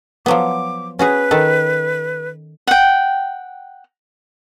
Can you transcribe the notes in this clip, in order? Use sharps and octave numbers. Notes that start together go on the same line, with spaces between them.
F3 F#3 B3 D6
C#4 F#4 G#4 B4
D#3 A4
F#5 G5